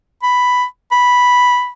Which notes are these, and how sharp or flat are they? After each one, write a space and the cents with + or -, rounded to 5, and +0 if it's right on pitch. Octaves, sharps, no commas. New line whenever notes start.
B5 +5
B5 -5